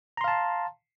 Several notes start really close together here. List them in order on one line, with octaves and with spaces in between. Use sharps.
A#5 C6 F5 A5